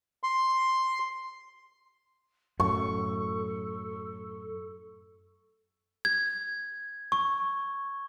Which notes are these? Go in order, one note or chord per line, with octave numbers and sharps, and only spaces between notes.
C6
F#2 A2 A4 C#6
G#6
C#6